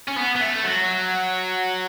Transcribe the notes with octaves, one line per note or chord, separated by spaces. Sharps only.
C#4
B3
B3
A3
F#3